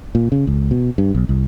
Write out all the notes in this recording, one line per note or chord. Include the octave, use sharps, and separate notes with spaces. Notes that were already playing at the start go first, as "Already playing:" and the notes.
A#2
C#3
C#2
B2
G2
B1
C2